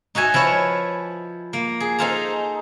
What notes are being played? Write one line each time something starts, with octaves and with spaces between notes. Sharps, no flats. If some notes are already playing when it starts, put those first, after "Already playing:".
D#4 F#4 E5 G#5
F3 E4 B4 C#5
A#3
G#4
D#4 G#4 A4 C5 F5 A#5